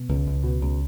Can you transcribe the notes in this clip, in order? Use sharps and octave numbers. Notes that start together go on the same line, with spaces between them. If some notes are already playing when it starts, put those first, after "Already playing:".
Already playing: B2
C#2
C#2
B2
C#2